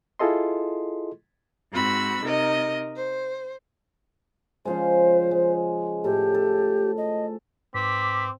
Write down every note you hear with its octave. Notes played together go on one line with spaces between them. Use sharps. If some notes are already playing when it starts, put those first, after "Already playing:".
E4 F4 G#4 A4 D#5 C6
G#2 C4 F#4 B5 E6
C3 D#4 A#4 D#5
C5
C#3 F3 G#3 C5
G#3
A2 G4 A4
A4
D#5
G#2 C4 B4 D6 B6